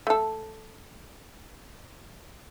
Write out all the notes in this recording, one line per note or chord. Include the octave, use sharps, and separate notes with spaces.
A3 A4